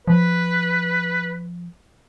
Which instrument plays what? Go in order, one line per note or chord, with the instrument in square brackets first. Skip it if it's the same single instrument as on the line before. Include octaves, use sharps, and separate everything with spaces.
[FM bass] F3 [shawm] B4